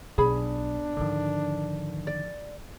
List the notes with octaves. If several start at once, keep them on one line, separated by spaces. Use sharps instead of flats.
B1 B2 D4 G#4 B5
G#2 D3 D#3 F3
D5